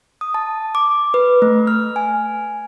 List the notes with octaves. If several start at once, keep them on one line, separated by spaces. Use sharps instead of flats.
D#6
A5
D6
B4
A3
F6
G#5